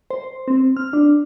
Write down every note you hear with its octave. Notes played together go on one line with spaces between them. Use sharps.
C5
C4
F6
D4